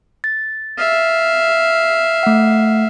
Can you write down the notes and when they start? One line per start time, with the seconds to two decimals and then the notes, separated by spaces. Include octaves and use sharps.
0.24 A6
0.78 E5 F5
2.23 A3 F#5